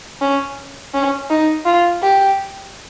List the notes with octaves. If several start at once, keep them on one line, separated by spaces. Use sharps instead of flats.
C#4
C#4
D#4
F4
G4